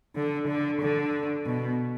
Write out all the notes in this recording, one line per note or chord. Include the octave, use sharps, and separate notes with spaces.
D3
D3
D3
B2